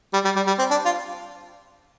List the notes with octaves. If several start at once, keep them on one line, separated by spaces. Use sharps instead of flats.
G3
G3
G3
G3
C4
D4
F4